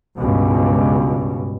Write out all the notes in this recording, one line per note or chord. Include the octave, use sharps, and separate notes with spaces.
C#2 G2 B2